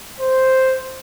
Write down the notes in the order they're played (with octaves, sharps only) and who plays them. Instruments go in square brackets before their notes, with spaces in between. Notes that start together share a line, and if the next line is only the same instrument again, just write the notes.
[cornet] C5